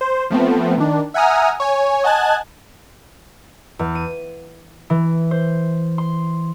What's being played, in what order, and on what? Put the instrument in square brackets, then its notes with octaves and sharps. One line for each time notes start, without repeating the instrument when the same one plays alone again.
[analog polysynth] C5
F3 A3 B3 C4
D#3 D4
E5 F#5 G#5 A#5 D#6 F6
C#5 G#5
D#5 F#5 G#5 A5 F#6 G#6
[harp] E2
D#7
E3
C5
C6